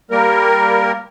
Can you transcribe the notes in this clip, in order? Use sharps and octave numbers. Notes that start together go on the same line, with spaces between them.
G3 A#3 A#4